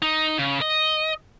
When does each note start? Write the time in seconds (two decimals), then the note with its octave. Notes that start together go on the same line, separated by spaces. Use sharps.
0.02 D#4
0.39 C#3
0.61 D#5